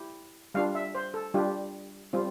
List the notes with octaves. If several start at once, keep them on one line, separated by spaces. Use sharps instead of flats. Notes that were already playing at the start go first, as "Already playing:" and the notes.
Already playing: E4 G4
G3 D4 F4 F5
E5
C5
A4
G3 D4 F4 G4
G3 C4 F4